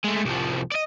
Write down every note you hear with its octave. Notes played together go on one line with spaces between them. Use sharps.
G#3 A3
C2 F3
D5 D#5